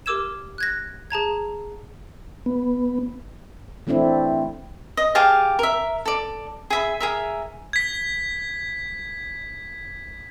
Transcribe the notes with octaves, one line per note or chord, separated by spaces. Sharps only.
G4 A#4 D6 E6 G#6 E7
F#6 G#6 A#6
G#4 A5 A#5 G#6
B3
E3 A3 C4 D4 E4
D#5
G4 G#4 F5 A5
A#4 E5
A4 D5
G#4 E5 B5
G#4 A#4 E5
G#6 B6